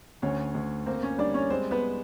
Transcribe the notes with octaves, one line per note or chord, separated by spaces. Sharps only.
D2 C#4 C#5
D2
A#3 C4 C5
C#4 C#5
G3 D4 D5
C#4 C#5
G#3 C4 C5
B3 B4